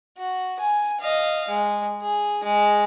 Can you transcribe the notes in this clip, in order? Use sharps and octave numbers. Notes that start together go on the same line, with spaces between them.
F#4
G#5
D#5 F5
G#3
G#4
G#3